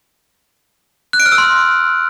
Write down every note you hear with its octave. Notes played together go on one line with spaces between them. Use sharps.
F#6
D7
F6
E6
C6